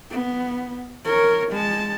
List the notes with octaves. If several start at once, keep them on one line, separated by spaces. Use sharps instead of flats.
B3
A#4 C#5
G#3 A5